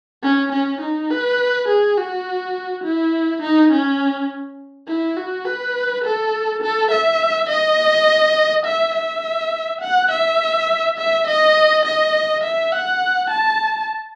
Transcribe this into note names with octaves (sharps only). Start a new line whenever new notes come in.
C#4
C#4
D#4
B4
G#4
F#4
E4
D#4
C#4
E4
F#4
B4
A4
A4
E5
D#5
E5
E5
F#5
E5
E5
D#5
D#5
E5
F#5
A5